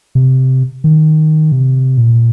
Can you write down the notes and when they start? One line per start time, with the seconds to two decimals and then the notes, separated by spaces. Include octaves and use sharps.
0.15 C3
0.84 D#3
1.52 C3
1.97 A#2